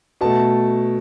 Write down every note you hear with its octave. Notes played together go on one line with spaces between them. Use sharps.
B2 A3 A5